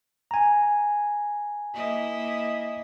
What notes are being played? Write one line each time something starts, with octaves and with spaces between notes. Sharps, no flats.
G#5 A#5
A#3 E4 D#5